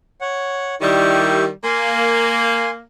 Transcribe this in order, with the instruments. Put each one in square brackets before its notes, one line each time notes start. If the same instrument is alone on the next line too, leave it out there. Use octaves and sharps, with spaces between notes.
[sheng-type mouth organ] C#5 F#5
[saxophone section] D#3 G3 [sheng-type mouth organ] E4 G4 C#6
[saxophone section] A#3 [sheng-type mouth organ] G#5 C6